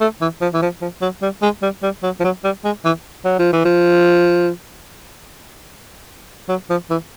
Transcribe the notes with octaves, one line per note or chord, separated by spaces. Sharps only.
A3
E3
F3
E3
F3
F3
F#3
G3
G#3
G3
G3
F#3
F3
F#3
G3
G#3
E3
F#3
F3
E3
F3
F#3
F3
E3